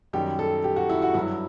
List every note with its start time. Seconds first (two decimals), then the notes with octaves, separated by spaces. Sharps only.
0.13 F#2 D#3 G3 G4
0.39 A4
0.64 G4
0.76 F#4
0.89 E4
1.02 F#4
1.14 G2 F#3 E4